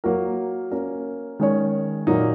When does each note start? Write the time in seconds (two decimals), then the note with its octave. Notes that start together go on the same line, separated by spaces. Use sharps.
0.04 F#3 A#3 F#4 A#4
0.71 A#3 C#4 A#4
1.39 D#3 G#3 C#4 G#4 C#5
2.07 A#2 F#3 A#3 D#4